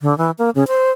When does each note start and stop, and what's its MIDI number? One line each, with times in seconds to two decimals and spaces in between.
0.02 0.16 50
0.18 0.31 52
0.38 0.50 58
0.55 0.64 49
0.68 0.91 72